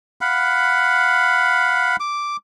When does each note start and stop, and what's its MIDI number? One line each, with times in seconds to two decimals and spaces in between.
0.21 1.96 77
0.21 1.96 78
0.21 1.96 83
2.00 2.37 86